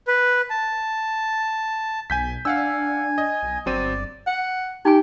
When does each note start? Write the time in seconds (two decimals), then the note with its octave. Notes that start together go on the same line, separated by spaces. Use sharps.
0.08 B4
0.50 A5
2.10 B1 G#5 G6 B6
2.45 D4 F5 F#5 G#5 E6
3.18 D#5
3.43 B1
3.66 G1 F#3 C4 D5 D#7
4.27 F#5
4.85 D#4 G4 G#5